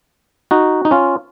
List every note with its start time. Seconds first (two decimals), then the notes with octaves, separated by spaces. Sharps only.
0.51 D#4 F#4
0.85 D#4
0.91 C#4 F4